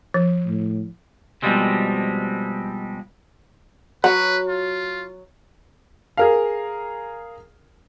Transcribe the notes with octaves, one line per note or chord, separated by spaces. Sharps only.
F3
A2
B2 F3 G3 G#3 C4
F#3 B4 F#5
F4
G#4 A#4 F5